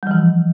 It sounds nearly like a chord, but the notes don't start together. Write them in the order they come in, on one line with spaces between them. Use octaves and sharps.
G3 F3 E3